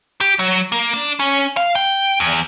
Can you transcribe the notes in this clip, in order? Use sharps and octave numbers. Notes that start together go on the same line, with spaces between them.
G4
F#3
A#3
D4
C#4
F5
G5
E2